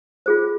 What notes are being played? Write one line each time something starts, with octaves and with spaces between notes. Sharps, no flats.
F4 G#4 C5